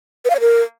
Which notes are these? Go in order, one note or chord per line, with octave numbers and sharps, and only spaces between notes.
B4
F5
C#5
A#4